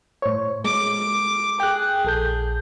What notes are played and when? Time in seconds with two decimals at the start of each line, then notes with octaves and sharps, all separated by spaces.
0.22 A2 C5 C#5
0.64 G#3 D6
1.60 G#4 G5 F#6
2.05 A#1 A4 G6